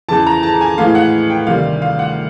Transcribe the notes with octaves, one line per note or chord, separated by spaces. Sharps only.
E2 C#3 E3 A5
A#5
A5
G#5
A2 E3 G#3 F5
F#5
G5
D2 C3 D#3 G3 F5
F5
F#5